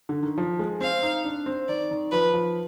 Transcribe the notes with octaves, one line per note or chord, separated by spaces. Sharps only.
D3
D#3
F3
G#3
C4 F5
D#4
D4
C4
D#3 D5
D#3
F3 B4
F3